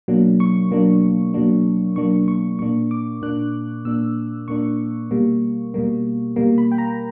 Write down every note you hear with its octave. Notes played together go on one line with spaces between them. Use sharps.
B2 F#3 A#3 D4
C#6
B2 F#3 A#3 D4
B2 F#3 A#3 D4
B2 F#3 A#3 D4 C#6
C#6
A#2 A#3 D4 C#6
D6
A#2 A#3 D4 F#6
A#2 A#3 D4 E6
A#2 A#3 D4 C#6
B2 G3 A#3
B2 G3 A#3
B2 G3 A#3
B5
G5
A#5